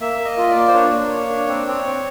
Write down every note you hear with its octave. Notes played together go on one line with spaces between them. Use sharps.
A#3 E5
A#3
D#5
F4
D5
A#3
C5
D4 C#5
A#3
A#3
D4
C4
C4
C4